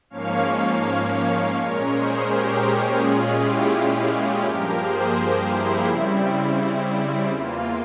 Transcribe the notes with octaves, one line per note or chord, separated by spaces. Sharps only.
G#2 F3 A#3 C#4 C#5 F5
A#2 G#3 C#4 A#4 C#5
G#4 C5
G4 A#4
A#2 G#3 C#4 F4 G#4
E4 G4
F4 G#4
G2 F3 A#3 G4 A#4
G#4 C5
E4
C#3 G3 C4 E4
E2 E3 A#3 F4